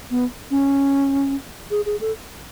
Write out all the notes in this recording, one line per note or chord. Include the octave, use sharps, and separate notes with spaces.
B3
C#4
G#4
G#4
A4